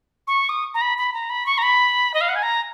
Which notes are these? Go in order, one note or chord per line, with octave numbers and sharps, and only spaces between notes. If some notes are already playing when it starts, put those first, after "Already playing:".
C#6
D#6
A#5
B5
B5
A#5
B5
C#6
A#5
B5
D#5
F5
F#5
G#5
A#5